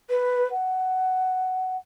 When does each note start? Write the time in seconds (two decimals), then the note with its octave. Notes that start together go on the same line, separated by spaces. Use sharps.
0.10 B4
0.51 F#5